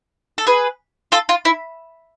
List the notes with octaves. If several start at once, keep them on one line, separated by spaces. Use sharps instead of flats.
A4
G#4 B4
F4 A4
F4
E4